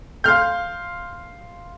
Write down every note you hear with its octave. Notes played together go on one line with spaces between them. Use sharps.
F5 C6 F6 G6